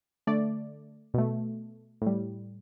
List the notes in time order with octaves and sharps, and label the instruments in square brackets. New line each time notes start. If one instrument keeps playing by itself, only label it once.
[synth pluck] D3 A3 D5
B2 A3
A2 G3